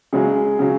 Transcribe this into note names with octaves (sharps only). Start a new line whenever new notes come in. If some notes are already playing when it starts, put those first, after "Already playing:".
C#3 F#3 G#3 G#4
C#3 F#3